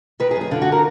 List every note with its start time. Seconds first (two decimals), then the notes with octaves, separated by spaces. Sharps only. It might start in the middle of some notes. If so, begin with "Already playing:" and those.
0.20 D#3 B4
0.31 G#4
0.36 F#2
0.41 G#4
0.51 D3 F4
0.62 F#4
0.72 A#4